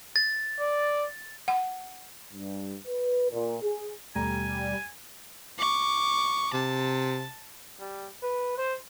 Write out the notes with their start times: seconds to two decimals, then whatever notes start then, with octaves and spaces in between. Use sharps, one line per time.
0.16 A6
0.60 D5
1.48 F#5
2.32 G2
2.87 B4
3.31 A#2
3.61 G#4
4.15 D#2 B2 G3 A3 G#5 A#5
5.59 C#6 D6
6.54 C3 A5
7.80 G3
8.22 B4
8.57 C5